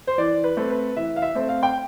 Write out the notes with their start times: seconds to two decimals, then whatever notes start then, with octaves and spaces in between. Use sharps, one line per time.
0.07 C5
0.18 E3 D5
0.44 B4
0.57 A3 C4
0.70 B4
0.96 E3 E5
1.16 F5
1.22 E5
1.35 A3 C4
1.49 F5
1.63 G5